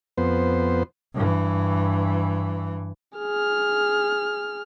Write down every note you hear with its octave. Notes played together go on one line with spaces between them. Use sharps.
F2 B3 C5
G2 E3
G#4 F6